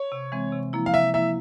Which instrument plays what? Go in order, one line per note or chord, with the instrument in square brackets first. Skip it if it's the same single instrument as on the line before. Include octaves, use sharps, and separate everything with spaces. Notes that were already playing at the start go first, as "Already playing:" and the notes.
Already playing: [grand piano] C#5
[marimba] C3
E3 G#3 C4
C3
F3 A#3 E4
[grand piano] F5
[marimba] C3 [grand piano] E5
[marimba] F3 A#3 E4 [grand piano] E5